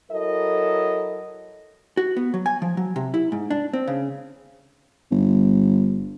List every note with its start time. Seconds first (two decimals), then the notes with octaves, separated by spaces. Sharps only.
0.11 F#3 E4 A4 A#4 D#5
1.97 F#4
2.16 B3
2.34 F#3
2.46 G#5
2.62 F3
2.77 F#3
2.96 C3
3.14 E4
3.32 G#2
3.50 D4
3.73 C4
3.88 C#3
5.11 G1